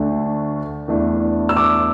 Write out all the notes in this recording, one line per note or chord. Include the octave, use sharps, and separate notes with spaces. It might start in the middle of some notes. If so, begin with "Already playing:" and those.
Already playing: D2 D3 A3 D4
E2 E3 A3 D4
E6
D6